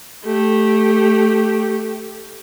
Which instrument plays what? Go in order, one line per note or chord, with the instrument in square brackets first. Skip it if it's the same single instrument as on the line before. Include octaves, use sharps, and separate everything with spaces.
[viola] A3 G4